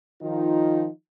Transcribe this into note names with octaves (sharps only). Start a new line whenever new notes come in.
D#3 F3 D#4 F4